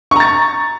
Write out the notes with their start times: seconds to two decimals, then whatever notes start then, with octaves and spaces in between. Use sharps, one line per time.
0.11 C#6
0.16 A#5
0.20 A6